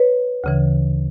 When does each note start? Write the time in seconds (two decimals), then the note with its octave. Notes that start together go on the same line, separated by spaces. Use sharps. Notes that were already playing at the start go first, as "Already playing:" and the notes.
Already playing: B4 C#5
0.44 D2 C#3 E3